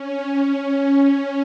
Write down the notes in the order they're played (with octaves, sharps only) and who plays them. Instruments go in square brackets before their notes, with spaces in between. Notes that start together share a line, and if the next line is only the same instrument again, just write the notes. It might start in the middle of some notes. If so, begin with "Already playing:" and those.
Already playing: [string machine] C#4